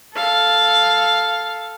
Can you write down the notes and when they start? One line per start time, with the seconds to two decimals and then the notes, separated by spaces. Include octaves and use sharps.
0.14 A4 F5